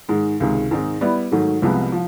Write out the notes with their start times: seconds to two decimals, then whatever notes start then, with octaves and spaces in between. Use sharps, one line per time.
0.09 G#2 D#3 G#3
0.40 C#2 C3 D#3 G#3
0.71 G#2 D#3 G#3 C4 D#4
1.01 G3 B3 E4
1.31 G#2 D#3 F#3 A3
1.62 C2 C3 F3 G#3 B3
1.92 F3